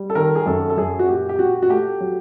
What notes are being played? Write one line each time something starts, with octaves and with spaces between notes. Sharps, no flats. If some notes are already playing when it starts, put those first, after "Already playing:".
Already playing: G3
A4
D#3 A#4
G#4
F#2 A4
A4
F#2 G#4
F#4
A#2 G4
G4
A#2 F#4
F#4
A3 G4
F#3